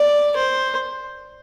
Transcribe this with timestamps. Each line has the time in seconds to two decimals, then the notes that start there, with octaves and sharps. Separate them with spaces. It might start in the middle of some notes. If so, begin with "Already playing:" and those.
Already playing: D5
0.36 C5